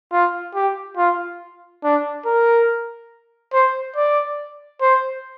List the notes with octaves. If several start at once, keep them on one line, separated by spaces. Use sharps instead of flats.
F4
G4
F4
D4
A#4
C5
D5
C5